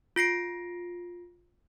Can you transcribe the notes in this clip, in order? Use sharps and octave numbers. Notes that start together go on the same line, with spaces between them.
F4 A#6 C7 D7